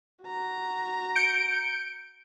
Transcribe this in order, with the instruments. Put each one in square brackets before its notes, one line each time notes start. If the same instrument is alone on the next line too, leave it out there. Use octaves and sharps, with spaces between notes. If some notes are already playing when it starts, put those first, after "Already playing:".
[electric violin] F#4 A#5
[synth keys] G6 C#7 D7